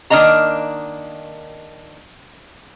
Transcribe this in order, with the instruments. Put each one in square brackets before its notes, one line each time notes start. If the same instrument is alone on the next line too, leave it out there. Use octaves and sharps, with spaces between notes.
[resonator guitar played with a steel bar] D#3 A#3 D4 D#5 A#5